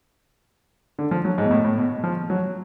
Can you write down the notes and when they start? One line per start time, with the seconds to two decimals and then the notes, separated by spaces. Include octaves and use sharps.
0.99 D3
1.11 F3
1.25 F#3
1.38 G#2
1.46 B2
1.51 A2
1.64 A2
1.77 B2
2.04 F3
2.30 F#3